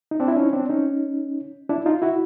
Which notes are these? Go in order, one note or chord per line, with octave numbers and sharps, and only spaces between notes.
D#4
C4 D4
E4
C#4 D#4
C4 D4
C#4 D#4
D4 E4
D#4 F4
E4 F#4